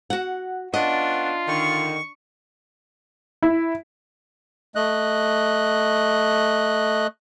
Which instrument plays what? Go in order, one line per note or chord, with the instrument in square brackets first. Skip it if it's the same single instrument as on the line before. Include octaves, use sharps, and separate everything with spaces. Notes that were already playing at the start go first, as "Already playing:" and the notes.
[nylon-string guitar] F#4 F#5
[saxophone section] B3 C#4 F#5 [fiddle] D4 [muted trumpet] F4 [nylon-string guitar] D#5
[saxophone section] D3 D#3 [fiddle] C#6
[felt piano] E4
[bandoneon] A3 D#5 F#6